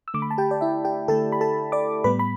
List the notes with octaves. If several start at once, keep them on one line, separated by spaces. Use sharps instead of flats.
E6
D3 A3 D6
B5
A5
G4 G5
D5
E4 E5
G4 G5
D3 A3 A4 A5
B5
A4 A5
D5 D6
A2 G3 B3 B4 B5
B5